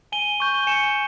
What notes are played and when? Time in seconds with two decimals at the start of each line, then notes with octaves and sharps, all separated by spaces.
0.12 G#5 D#7 G7
0.40 C#6 G6
0.54 G7
0.67 G#5 C#7 E7